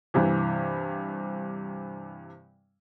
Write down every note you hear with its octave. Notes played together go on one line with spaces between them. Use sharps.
G2 C3 E3